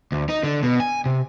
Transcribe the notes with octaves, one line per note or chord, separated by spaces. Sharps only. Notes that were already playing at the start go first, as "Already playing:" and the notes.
D2
D#4
D3
B2
G#5
C3